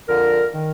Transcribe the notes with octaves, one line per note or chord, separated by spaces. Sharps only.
F2 D3 A#4
D#3